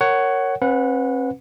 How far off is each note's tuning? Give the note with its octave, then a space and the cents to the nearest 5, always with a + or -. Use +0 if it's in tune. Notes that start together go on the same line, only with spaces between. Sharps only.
A#4 -10 C#5 +0 F#5 +15
C4 +45 B4 +0 F#5 -25